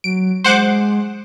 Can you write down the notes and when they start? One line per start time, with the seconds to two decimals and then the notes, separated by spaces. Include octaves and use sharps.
0.04 F#3 D7
0.44 G#3 C5 F#5 D6